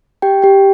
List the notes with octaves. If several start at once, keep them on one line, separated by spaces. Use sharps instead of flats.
G4 G5
G4 G5